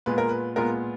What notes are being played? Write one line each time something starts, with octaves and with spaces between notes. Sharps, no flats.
A#2 G#3 B3 F4 B4
A#4
B4
A#2 G#3 B3 F4 A#4